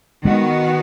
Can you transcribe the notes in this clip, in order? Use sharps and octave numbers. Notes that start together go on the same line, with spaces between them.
D#3 G#3 B3 F#4